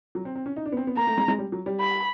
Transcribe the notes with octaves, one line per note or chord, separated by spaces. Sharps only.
F#3
C4
C4
C#4
D#4
D4
B3
C4
B3
A#3 A#5
A3
G#3
G#3
G3
F#3
G3
B5